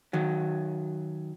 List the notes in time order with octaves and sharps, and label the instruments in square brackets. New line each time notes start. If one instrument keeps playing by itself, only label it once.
[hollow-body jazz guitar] D#3 F#3